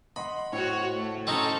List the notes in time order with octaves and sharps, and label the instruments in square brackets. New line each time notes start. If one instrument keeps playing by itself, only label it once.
[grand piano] D#5 F#5 C6 [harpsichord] B5
[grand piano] A2 C5 C#7 [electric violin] F#4 C#5
[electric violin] A3
[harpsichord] C4 C#4 D#4 [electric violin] A4 A#5